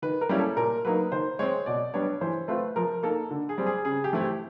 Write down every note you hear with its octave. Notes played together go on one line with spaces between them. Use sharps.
D#3 B4
A#4
G3 A#3 C#4 E4
A4
A#2 A#4
F#3 A#3 D#4 B4
D#3 C5
G#3 C4 C#5
B2 D5
G3 B3 D4 C#5
E3 C5
A3 C4 F4 B4
F3 A#4
A#3 D#4 A4
D3
G#4
G3 C4
G#4
C#3 G#4
G4
E3 A3 C4 E4
G4